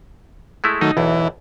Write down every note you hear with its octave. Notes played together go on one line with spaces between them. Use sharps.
G#3 A3 E4
D#3 F#3 A3 D#4
B1 E2 E3